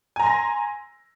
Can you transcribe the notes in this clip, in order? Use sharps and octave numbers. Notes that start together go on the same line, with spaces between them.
G#5 A#5 C6 A#6